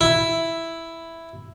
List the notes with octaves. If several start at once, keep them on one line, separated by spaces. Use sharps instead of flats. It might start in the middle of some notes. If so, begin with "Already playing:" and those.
E4